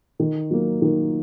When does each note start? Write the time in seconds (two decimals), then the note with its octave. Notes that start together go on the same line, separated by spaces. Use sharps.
0.20 D#3
0.51 F#3 A#3
0.82 D#3